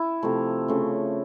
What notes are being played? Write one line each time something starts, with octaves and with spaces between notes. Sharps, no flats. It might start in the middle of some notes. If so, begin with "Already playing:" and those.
Already playing: E4
C3 F3 A3
C#3 F3 A3